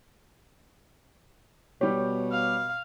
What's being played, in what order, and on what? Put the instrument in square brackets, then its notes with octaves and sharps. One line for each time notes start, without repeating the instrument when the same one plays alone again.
[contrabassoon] B2 [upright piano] G3 G4 [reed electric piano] C#5
[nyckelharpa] F5